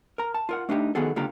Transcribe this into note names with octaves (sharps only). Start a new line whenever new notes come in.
A#4 A#5
A5
F4 A#4 F#5
A3 D4 D#4 F4 G4
D#3 B3 F#4 G#4 A4
C#2 D3 A#3 F4 G4 A#5